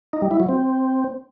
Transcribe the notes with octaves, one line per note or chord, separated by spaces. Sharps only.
D#4
G3
E4
F#3
C4